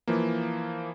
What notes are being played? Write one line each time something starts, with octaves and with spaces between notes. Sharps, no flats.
E3 F3 A#3